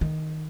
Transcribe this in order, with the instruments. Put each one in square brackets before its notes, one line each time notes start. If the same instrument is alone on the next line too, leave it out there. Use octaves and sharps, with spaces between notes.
[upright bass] D#3